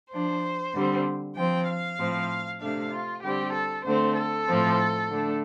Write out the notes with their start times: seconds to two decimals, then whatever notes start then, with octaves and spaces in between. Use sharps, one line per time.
0.12 F3 D4 C5
0.74 D3 G3 C4
1.36 F3 C4 G5
1.67 F5
1.99 A2 F3 C4
2.60 C3 A3 D4 F5
2.92 F4
3.23 D3 G3 C4 G4
3.54 A4
3.85 D3 A3 C4 C5
4.16 A4
4.47 A2 F3 C4
5.09 D3 A3 D4